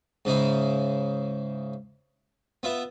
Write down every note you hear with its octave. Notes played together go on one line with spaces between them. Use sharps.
G#2 C#3 D#4 E4
B3 F4 E5